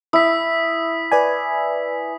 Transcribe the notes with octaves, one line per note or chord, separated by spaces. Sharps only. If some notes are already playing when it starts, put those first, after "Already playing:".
E4 D#6 B6
B4 D5 G#5